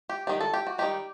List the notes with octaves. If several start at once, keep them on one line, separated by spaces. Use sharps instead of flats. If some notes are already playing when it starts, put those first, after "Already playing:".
G4
D#3 G3 D#4 G4
A4
G4
F#4
D#3 G3 D#4 G4